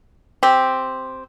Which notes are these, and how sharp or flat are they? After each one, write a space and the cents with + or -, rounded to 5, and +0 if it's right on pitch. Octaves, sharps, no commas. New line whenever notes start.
C4 +0 G4 +0